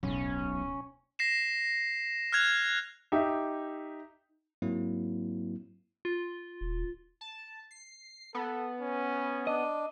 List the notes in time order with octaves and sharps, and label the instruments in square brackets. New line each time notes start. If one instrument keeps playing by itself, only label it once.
[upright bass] D1 B2 [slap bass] B1 G#2 [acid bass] C#4
[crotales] A#6 C7 E7
F6 F#6 G#6 F7
[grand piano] D#4 G4 E5
[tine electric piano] G#2 F#3 A#3 C4 E4
[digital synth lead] F4
[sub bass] D#1
[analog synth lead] A5
C7
[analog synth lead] B3 [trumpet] A4
[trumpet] C#4
[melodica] D4 [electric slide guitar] D#5